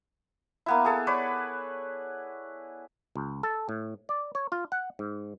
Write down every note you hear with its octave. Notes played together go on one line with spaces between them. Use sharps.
A#3 B3 E4
G#4 A4
B4 C#5 D5
C#2
A4
A2
D5
C#5
F4
F#5
G#2